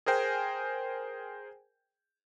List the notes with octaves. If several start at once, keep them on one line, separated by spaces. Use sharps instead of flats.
G#4 A#4 C5 G5 G#5